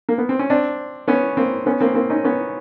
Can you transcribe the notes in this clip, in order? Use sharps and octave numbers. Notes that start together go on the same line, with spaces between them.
A#3
B3
C4
C#4
C4 D4
B3 C#4
A#3 C4
B3 C#4
A#3 C4
A#3 C4
C#4 D#4
B3 C#4